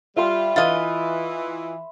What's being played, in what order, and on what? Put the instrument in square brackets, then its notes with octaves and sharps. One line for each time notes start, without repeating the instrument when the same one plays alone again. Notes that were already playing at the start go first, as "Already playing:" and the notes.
[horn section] G3 F4 [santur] E5 B5 C6
[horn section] E3 [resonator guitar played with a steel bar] F4 D#5